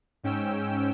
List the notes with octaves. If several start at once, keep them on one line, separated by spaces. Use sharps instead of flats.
G#2 C#4 G5 E6